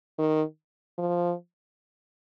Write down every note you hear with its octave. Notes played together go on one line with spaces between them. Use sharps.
D#3
F3